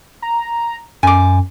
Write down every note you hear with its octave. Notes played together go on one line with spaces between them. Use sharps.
A#5
F#2 G#5 D6